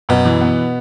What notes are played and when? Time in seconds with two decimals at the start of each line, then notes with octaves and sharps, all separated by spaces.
0.09 F#2 B2
0.25 E3
0.41 B3